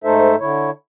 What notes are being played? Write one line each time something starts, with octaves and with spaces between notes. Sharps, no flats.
G#2 A3 D#4 A4 C5 E5
D3 E4 C#5